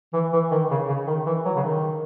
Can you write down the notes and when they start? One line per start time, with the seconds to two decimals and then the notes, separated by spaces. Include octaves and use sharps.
0.13 E3
0.33 E3
0.51 D#3
0.71 C#3
0.88 C#3
1.07 D#3
1.26 E3
1.45 F#3
1.56 C#3
1.64 D#3